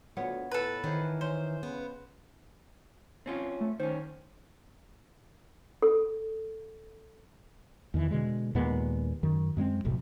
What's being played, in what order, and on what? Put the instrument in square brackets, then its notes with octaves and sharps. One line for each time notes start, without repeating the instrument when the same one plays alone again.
[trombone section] D2 [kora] B3 F4 C#5
[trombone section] A2 [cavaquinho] A4 B4
[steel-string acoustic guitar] D#3 [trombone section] E3 [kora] C5 C#5
[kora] C#4 [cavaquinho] C5
[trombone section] C#3 B4 [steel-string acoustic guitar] B3
[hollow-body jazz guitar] C4 C#4 F4
[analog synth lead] A3
[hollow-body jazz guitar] D#3 C#4 [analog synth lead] C5
[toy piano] A4
[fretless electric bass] E2 D#3 E3
B2 D3 G#3
D#2 A#2 G#3 B3
F#2 D#3
F#2 G#3 A#3 C4
F1 B1 A2 C3